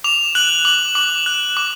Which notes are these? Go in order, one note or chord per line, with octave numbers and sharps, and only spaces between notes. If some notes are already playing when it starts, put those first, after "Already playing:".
D6 F7
F#6 F#7
D6 F#7
D6 F#7
F#6
D6